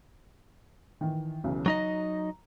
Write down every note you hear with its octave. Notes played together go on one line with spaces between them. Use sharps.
D#3 E3
B1 C#3 E3
F#3 D#4 D#5 A#5